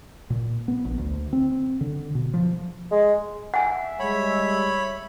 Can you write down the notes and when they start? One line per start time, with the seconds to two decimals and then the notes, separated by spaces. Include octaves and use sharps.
0.30 A#2
0.68 B3
0.85 A#1
0.98 D2
1.33 C4
1.81 D3
2.15 B2
2.34 F3
2.91 G#3
3.54 E5 F#5 G#5
4.00 G3 G#3 C#5 B5